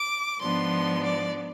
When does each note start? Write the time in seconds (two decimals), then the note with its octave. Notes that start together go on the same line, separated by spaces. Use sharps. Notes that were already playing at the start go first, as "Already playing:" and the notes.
Already playing: D6
0.40 G#2 F3 B3 D4 C6
1.02 D5